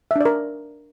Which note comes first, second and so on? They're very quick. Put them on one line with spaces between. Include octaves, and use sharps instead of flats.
E5 D4 D5 A#4